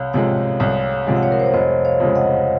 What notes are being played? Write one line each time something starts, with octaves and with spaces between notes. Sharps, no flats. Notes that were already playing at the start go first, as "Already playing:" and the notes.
Already playing: C2 C#5 F5
C3 F3 G#3 C#5 F5
C2 C#5 F5
C3 F3 G#3
F#5
C#5 F5
A#4
C5
C#5
F1 C5 D#5
C#5 F5
F2 C#3 G#3
D#5 F#5